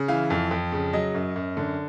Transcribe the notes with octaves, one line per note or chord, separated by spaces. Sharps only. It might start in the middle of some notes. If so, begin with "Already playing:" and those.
Already playing: C#3
E3 F5
F2
F2
C#3
F#3 D#5
F#2
F#2
D3